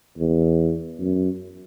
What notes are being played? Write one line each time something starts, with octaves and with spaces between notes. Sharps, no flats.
E2
F#2